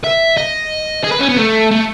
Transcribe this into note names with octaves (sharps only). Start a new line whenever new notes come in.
E5
D#5
G#4
B4
C#4
B3
A3
A3